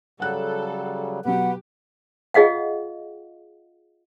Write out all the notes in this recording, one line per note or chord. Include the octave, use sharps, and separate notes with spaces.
C#3 F#3 G3 A4 F#5 F#6
B2 F#3 G4 B4 F#5
F4 G#4 D#5 F5 F#5